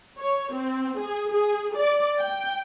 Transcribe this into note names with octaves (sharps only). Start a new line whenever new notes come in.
C#5
C4
G#4
G#4
D5
G5